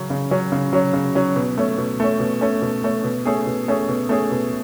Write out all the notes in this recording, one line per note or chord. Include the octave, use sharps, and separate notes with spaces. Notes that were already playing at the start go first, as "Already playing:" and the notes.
Already playing: C#3 F#3 C#4
C#3
F#3 C#4
C#3
F#3 C#4
C#3
F#3 C#4
B2
A3 C#4
B2
A3 C#4
B2
A3 C#4
B2
A3 C#4
B2
A3 C#4 G#4
B2
A3 C#4 G#4
B2
A3 C#4 G#4
B2